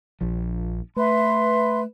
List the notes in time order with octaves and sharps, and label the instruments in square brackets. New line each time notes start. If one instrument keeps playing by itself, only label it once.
[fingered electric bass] A#1 F3
[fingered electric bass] A3 [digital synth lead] B4 [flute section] E5 C6